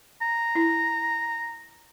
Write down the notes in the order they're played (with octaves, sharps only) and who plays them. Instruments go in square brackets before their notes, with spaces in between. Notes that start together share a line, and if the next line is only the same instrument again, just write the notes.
[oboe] A#5
[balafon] E4